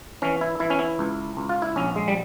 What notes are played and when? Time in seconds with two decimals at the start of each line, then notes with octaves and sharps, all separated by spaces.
0.22 E3 C#4
0.41 E4
0.60 E3 E4
0.70 C#4
0.79 E4
0.99 C#2
1.37 C#2
1.49 F4
1.62 E4
1.76 A#1 C#4
1.96 G#3
2.08 G3